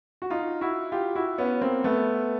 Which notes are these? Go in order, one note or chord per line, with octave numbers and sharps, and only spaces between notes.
F#4
D#4 F4
E4 F#4
F4 G4
E4 F#4
B3 C#4
A#3 C4
A3 B3